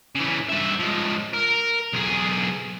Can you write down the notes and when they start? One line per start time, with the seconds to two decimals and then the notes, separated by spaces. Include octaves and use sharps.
0.16 C#3 E3
0.49 G2 E5
0.80 F3 G#3
1.34 A#4
1.93 B1 G#4